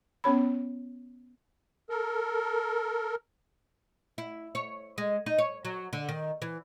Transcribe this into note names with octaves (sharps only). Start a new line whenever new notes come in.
B3 C#4 C#5 B5
A4 A#4
E4
C#5
G#3
D#4
C#5
F#3
D3
D#3
E3